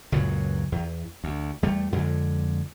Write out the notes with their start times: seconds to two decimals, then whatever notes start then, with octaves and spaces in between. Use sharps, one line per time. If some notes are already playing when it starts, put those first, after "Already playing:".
0.12 C#2 F#2 A#2 F#3
0.72 E2
1.24 D2
1.63 E2 G3 A3
1.92 F2 D3 G#3